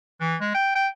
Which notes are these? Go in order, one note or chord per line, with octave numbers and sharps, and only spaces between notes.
E3
G#3
G5
G5